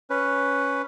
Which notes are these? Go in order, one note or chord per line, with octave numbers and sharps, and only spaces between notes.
C#4 B4